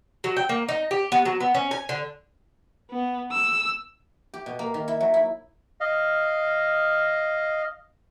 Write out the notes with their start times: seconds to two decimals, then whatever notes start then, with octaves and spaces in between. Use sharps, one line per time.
0.24 F#3
0.37 G5
0.49 A#3
0.69 D#4
0.91 G4
1.12 B3
1.25 F#3
1.40 B3
1.55 C#4
1.71 G#5
1.89 D3
2.91 B3
3.32 E6
4.34 G4
4.46 B2
4.59 A#3
4.74 D#3
4.88 E4
5.01 F#3
5.14 E4
5.81 D#5 F5